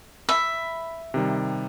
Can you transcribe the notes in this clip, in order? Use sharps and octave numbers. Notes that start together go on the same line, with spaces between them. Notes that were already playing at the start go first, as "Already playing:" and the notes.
E5 B5
C3 D#3 G3